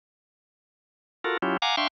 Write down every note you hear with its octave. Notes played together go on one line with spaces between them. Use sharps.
F4 F#4 A4 A#4
F#3 C#4 E4 F4 G4
F5 F#5 G#5 A#5 D6
D4 E5 F5 G5 C6 C#6